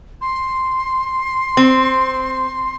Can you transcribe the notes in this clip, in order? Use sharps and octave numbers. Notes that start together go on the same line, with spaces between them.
C6
C4